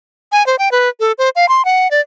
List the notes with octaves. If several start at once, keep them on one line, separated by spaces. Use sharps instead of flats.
G#5
C5
G5
B4
A4
C5
F5
C6
F#5
D5